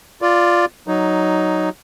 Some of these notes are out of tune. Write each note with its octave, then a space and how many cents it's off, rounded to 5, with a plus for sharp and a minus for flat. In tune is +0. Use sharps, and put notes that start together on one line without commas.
F4 +0 D5 +0
F#3 +5 D#4 +0